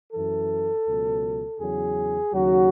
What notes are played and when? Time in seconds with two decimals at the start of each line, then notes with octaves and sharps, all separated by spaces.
0.13 F#2 E3 A4
0.87 C#2 B2 F#3
1.60 E2 C#3 F#3 G#4
2.33 D#2 C#3 F#3 F#4